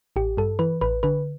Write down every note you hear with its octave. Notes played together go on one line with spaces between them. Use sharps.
A1 G4
G2 A4
E3 B4
A1 B4
D3 B4